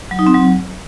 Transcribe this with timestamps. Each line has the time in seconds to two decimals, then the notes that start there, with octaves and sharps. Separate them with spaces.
0.11 F#3
0.19 D#4
0.27 C4
0.34 F#3